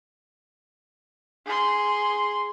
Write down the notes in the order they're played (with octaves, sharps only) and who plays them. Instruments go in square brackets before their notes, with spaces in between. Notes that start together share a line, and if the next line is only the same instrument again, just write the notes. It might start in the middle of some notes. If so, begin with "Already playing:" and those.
[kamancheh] G#4 C6